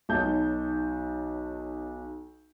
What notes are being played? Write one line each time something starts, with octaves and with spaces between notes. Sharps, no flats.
B1 D#4 A5 G6